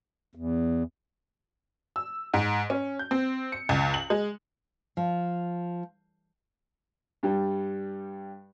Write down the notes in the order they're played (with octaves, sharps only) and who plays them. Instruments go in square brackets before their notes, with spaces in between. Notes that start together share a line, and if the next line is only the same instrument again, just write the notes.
[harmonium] E2
[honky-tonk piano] E6
G#2
C#4
G6
C4
C#7
C#2
F#7
G#3
[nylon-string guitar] F3
[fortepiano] G2 G3